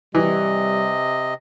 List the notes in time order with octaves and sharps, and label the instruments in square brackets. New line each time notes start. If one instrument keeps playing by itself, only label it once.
[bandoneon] C3 D#5 [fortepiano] E3 [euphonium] G3